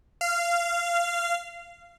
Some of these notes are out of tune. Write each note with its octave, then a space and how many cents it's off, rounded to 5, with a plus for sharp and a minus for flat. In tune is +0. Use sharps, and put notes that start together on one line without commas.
F5 -20